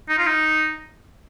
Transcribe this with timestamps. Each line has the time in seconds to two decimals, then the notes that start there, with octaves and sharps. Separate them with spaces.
0.09 D#4
0.18 F4
0.27 D#4